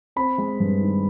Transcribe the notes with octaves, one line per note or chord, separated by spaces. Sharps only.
C4 B5
G#3
G2
D#3